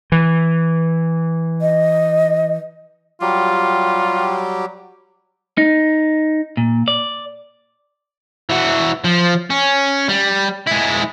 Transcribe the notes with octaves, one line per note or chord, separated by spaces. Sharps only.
E3
D#5
F#3 G3 F4 G4
D#4
A#2
D5
E3 F#4
F3
C#4
G3
G#3 E4